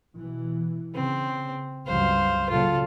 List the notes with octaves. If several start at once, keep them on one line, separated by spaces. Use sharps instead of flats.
B2 E3
C#3 C4
C#2 G2 F#3 C5 F5
A#2 C#3 F#3 F4 A4